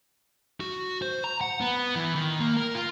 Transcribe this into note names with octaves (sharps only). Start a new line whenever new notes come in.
F#4
C5
A#5
F#5
B3
E3
D#3
A#3
A#4
F4